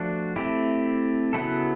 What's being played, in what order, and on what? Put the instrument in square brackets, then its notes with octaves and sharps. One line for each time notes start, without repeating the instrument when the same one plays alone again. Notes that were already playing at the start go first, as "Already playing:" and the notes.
Already playing: [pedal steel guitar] F3 A3 D4 F#4
A3 C4 E4 G4
C#3 F#3 B3 E4 A4